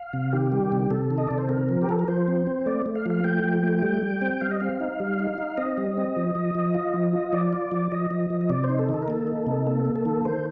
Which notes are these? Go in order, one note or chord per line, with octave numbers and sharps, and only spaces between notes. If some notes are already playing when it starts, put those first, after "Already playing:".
Already playing: F5
C3
D#3 G4
G3
C3
C3 A4
D#3
D#5
C3 D5
C5
C4 A#4
F3
G4
F3 A4
A#4
F3 C5
C4
C4
A3 D5
A3
F5
F3 F5
A3 G5
F3
A3
G3
G3
C4
G3 F5
D#5
C4 F5
D#4
G3
D#4
D#4
C4 D#5
G3
C4
F3
F3
F3
F4
F3
F4
F3 D5
F4
F3
F3 D#5
F3
F3
D#5
C3 D5
C5
D#4
A4
D#3
A4
A#4
A#3 A4
D#4
C3
A#3 A4
A#3
A4
D#3
D#3 C5